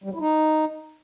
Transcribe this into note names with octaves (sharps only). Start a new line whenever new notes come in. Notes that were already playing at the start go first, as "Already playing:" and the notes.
G3
F#3
E4
D#4